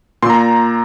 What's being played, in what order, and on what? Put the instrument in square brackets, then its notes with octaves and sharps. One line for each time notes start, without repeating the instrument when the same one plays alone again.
[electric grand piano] A#2 C6
A#5